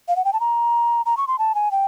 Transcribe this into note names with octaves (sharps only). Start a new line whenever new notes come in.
F5
F#5
G5
A5
A#5
A#5
C#6
C6
A5
G#5
G5